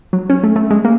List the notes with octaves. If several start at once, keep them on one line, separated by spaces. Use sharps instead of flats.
F#3
C#4
A3
A3
G#3
A#3